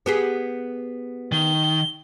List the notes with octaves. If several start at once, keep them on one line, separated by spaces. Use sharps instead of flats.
B3 G4 G#4
D#3 G7